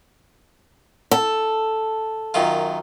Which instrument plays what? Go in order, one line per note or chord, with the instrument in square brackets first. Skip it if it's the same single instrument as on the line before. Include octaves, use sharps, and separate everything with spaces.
[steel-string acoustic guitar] A4
[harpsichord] F#2 D#3 F4